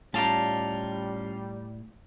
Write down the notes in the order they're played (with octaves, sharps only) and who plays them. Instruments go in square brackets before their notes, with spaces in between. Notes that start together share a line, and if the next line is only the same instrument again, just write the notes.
[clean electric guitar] A2 [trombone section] G3 [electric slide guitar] C#4 F4 [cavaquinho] D#4 D5 A5